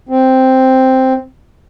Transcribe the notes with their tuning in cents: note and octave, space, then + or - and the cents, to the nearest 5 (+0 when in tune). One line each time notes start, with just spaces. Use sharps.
C4 +0